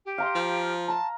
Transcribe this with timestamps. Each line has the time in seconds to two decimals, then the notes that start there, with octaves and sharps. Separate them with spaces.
0.05 G4
0.18 F5 A#5 C6
0.35 F3
0.88 A5 A#5